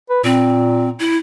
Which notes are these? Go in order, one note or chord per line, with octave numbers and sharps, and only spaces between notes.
B4
A#2 C4
E4